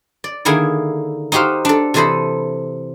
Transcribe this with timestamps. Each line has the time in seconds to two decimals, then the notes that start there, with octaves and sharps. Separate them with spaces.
0.24 D5
0.45 D3 D#3 A#3 E4 G#4
1.32 D#4 F#4 G4 C5 F5
1.65 D4 A4
1.94 C3 E3 A4 C5 D#5 B5